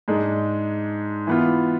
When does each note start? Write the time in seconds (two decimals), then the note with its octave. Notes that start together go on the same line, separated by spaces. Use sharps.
0.08 G#2 G#3 D4
1.27 E3 B3 F4